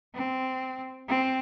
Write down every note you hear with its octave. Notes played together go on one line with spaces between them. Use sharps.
C4
C4